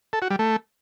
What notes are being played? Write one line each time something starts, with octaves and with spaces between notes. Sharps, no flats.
A4
F#4
G3
A3